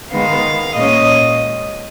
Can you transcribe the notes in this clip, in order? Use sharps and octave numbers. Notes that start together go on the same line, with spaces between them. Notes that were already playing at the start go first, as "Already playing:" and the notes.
D#3 G#3 B3 F5
A#2 G#3 C#4 D#5